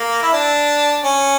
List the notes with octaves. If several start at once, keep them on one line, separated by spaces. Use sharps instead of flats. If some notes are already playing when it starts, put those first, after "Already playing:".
Already playing: A#3
E4
D4
C#4